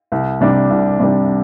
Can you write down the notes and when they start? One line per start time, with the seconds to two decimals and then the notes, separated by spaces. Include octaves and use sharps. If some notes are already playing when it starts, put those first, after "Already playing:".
0.12 C2
0.41 C3 G3 D4
0.70 C2
0.99 C3 G3 D4